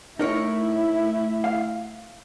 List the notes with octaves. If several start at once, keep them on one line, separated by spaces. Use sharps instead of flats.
A3 D#4 E4 A#4 C#5
F5